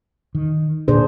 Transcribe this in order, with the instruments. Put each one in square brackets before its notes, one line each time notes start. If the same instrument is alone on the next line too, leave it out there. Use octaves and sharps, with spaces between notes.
[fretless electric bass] D#3
[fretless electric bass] A#2 D3 [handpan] D4 G#4 C5